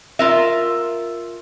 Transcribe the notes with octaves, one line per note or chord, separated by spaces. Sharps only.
F4 A#4 E5